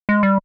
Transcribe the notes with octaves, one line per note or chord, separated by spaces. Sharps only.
G#3
G3